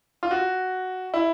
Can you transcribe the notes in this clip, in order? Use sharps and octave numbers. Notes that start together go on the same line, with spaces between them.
F4
F#4
E4